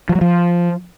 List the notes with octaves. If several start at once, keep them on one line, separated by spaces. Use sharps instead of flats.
F3
F#3
F3